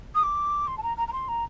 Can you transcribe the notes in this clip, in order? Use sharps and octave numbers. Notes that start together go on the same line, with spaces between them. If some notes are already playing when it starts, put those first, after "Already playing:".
D#6
D6
C6
A5
A#5
A#5
A#5
C6
A#5